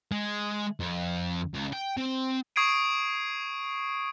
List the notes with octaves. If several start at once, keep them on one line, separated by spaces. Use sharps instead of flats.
G#3
F2
C#2
G5
C4
C#6 D#6 G#6 C7 D7 D#7